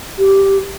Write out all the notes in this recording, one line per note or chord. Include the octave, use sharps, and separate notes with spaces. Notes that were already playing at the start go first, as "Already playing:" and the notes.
G4